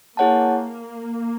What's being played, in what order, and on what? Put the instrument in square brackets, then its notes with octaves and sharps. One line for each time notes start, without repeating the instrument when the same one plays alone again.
[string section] A#3 [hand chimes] E4 G#4 C#5 F#5 A5